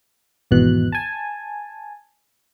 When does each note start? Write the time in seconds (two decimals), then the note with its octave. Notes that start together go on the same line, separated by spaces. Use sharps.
0.51 G#1 E2 B2 F#6
0.92 G#5 A5